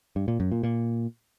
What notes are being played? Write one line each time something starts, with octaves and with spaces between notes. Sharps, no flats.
G2
A#2
F#2
A#2
A#2